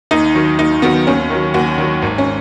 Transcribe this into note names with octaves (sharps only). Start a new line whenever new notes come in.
D#2 D#4
D#3 F#3
D#2 D#4
D#3 F#3 B3
D#2 C#4
D#3 F#3
D#2 F#4
D#3 F#3
G#1
C#4